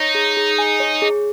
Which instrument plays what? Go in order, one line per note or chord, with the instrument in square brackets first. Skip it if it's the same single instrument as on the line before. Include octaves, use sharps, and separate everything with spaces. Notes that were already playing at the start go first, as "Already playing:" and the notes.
Already playing: [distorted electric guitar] D#4 [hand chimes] C#5
[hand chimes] G#4
G#4
G#5
C#5
G#4